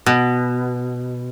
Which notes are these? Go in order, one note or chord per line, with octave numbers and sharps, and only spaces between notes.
B2